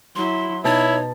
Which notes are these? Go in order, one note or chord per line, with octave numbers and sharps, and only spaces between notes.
F#3 E4 C6
B2 D#4 E4 C#5 A5